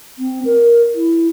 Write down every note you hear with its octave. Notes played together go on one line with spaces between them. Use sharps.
C4
A#4
E4